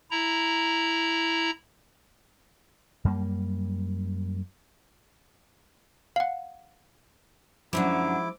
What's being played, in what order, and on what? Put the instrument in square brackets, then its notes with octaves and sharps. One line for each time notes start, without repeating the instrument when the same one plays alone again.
[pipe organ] E4 A#5
[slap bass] F#2 G3 A3 A#3
[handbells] F5 F#5
[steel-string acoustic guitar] F#2 D3 F#3 [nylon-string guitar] F3 G#3 D#4 [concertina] E4 D6